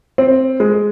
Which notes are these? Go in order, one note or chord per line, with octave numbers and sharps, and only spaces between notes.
C4
G#3